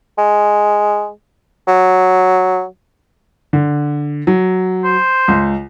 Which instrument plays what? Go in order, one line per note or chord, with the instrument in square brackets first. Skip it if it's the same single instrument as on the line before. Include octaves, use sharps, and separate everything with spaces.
[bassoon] G#3
F#3
[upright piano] D3
F#3
[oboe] C5
[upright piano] C#2